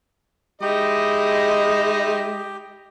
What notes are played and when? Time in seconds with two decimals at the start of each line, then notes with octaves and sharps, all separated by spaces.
0.62 G#3 D#4 E4 G4 D#5